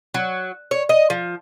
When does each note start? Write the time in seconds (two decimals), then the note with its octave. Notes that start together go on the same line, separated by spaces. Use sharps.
0.14 F#3
0.71 C#5
0.89 D#5
1.10 F3